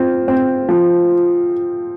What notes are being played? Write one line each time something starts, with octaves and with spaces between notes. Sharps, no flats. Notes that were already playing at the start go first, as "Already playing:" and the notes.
Already playing: C4 F4
C4
F3